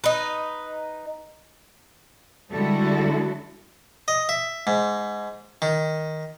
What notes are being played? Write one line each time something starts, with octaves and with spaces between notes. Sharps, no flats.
D#4 B4
D3 G3 G#3 E4 F#4 A4
D#5
E5
G#2
D#3